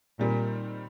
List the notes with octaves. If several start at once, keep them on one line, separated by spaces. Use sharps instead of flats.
A#2 D#3 G3 C4